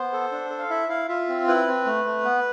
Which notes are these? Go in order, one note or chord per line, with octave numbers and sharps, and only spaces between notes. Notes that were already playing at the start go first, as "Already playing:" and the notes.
Already playing: B3 C5
A4
D4
A4
F5
E4 E5
E4 F5
F4 E5
C4
E4 B4
C4
A3
A3
B3